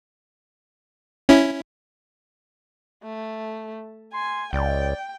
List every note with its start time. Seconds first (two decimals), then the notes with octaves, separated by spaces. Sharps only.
1.29 C#4 E4
3.03 A3
4.13 G#5 C6
4.53 C#2 D5 G5